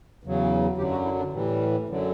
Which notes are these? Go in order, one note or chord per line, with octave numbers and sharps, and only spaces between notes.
E2 C#3 F#3
F#2 D3 F#3 G4
F#4
E4
D4
A2 E3 G3
F#2 D3 F#3